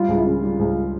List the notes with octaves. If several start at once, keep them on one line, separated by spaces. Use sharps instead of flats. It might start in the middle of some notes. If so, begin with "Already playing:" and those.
Already playing: G3 F4
C#2
E4
C#3
G3
C#2